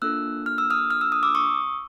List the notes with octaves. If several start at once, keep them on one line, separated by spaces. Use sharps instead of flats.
A#3 D4 F4 A4 E6 F#6
F6
E6
D#6 F6
F6
E6
D#6
D6 E6
C#6 D#6